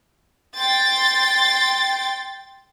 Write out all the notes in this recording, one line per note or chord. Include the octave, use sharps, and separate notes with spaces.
G5 C6 A6